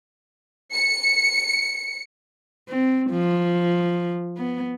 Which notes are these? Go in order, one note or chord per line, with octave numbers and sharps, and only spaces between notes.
C#7
C4
F3
B3